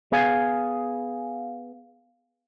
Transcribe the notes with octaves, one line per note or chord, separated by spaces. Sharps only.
B3 G#4 F5 G#5